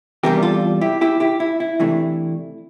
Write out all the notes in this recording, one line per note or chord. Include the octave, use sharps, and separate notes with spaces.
E2 C3 G3 D4 G4 A#4
F4 A4
E4 G4
E4 G4
E4 G4
E4
E4
C3 E3 A3 D4